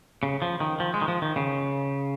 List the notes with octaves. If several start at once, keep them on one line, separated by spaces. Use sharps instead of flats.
C#3
F3
D#3
F3
G#3
D#3
F3
D#3
C#3